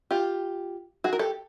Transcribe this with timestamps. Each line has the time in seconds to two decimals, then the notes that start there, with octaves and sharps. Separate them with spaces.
0.11 F4 G4
1.04 F#4 G#4
1.13 A#4
1.19 G4 A4